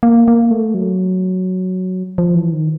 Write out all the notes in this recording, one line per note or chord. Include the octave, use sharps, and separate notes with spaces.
A#3
A#3
A3
F#3
F3
E3
D#3